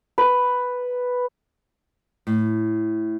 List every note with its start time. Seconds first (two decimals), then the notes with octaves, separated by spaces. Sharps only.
0.18 B4
2.27 A2